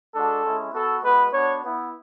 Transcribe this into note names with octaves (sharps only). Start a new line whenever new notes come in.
G#3 D4 F#4 A4
G#3 C#4 E4
B3 F#4 A4
G#3 B3 F#4 B4
B3 D4 F#4 C#5
B3 E4